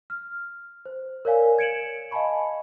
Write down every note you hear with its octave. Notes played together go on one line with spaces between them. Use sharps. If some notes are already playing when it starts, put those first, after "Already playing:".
F6
C5
A#4 C#5 D5 F5 G#5
G#6 C#7 D7 E7 F#7
D#5 F5 G#5 A5 B5 C#6